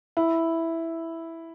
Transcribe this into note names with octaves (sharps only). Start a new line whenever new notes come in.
E4